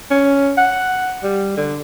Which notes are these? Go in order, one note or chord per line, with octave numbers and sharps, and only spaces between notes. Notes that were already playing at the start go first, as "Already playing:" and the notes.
C#4
F#5
G3
D3